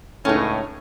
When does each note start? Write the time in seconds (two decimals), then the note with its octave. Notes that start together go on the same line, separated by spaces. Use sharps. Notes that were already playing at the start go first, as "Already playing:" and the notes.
0.25 C#2 A2 C#4 D#4